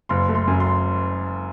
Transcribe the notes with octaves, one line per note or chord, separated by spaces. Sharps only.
F#1 C6
A3
C6
F#2
C6